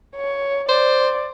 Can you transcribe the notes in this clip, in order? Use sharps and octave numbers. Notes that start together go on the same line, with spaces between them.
C#5
C5 D5